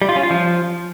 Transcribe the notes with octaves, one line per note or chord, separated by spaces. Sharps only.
G3
F4
C#4
F4
F3